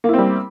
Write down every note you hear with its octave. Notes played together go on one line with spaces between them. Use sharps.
G3 A#3 C4 E4